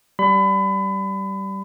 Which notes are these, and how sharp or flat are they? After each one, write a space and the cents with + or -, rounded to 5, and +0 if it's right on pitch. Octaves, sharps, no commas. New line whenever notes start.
G3 -20 B5 +30